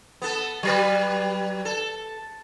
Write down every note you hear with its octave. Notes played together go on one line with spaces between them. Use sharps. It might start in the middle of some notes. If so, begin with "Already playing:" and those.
B3 A4
F#3 G3 B4
A4